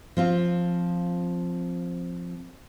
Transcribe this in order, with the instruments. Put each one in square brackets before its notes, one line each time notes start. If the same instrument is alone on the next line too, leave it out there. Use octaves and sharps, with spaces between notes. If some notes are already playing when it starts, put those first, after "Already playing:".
[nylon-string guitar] F3 C4 F4